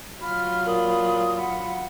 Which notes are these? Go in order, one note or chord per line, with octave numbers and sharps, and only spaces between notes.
F#3 F4 B5 F6
A#2 B5 D#6
F#5 B5